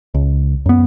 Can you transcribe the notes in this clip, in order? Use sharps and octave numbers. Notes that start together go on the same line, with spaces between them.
C#2
F#2 B3